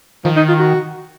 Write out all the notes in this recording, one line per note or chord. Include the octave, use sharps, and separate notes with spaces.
D#3 F3
D#4
F4
F#4